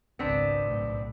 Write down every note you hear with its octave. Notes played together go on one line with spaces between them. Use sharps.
G#1 C#2 B3 C4 D4
B1 A2